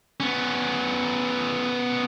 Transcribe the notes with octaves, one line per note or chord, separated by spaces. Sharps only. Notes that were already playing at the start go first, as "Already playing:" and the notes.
B3 C#4